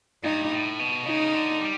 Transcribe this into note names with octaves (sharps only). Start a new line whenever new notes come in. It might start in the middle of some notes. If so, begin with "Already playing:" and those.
G2 D#4
A2
B2
C#3 D#4
D3
G3